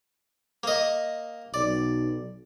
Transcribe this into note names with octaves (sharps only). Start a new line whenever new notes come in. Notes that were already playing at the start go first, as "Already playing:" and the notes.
A#3 D#5
B1 D5